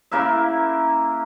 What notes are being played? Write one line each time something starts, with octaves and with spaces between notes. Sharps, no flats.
C#3 A#3 E4 E5